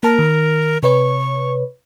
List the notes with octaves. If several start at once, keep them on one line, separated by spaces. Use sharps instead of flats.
A#3 A#4 A5
D#3
C3 B4 C#5 C#6